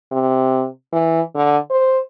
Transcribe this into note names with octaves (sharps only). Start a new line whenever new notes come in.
C3
E3
D3
C5